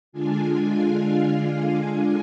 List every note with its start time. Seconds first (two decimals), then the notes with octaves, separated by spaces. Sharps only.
0.12 D3 G#3 D4 F4 G#5
0.63 F5